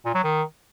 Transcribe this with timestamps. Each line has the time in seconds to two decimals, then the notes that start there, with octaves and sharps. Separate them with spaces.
0.05 A#2
0.15 F#3
0.24 D#3